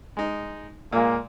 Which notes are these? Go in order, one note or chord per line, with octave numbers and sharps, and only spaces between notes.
G#3 D#4
A#2 G#3 A#3